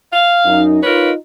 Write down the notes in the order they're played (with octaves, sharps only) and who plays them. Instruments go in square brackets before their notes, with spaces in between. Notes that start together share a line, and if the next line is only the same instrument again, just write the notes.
[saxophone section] F5
[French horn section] F#2 D#4
[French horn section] D#4 F4 [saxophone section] A#4 B4 C#5